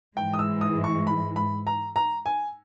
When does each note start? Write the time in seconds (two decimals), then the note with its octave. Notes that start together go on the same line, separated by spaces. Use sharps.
0.16 G#2 E3 G#3 G5
0.33 D#6
0.39 E6
0.61 D#6
0.84 C#6
1.07 B5
1.36 B5
1.67 A#5
1.96 A#5
2.26 G#5